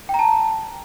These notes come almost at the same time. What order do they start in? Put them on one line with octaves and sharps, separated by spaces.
G5 A#5 A5